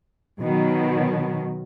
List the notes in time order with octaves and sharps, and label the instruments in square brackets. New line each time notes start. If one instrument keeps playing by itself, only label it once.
[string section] B2 D#3 F#3